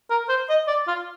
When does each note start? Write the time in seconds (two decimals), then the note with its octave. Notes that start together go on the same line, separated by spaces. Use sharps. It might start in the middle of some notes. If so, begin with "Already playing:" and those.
0.10 A#4
0.29 C5
0.49 D#5
0.68 D5
0.88 F4